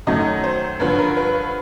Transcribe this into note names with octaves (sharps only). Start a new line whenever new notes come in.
F#2 D#3 F#3 A3 D#5
C5
G2 D3 F3 B4
A#4
B4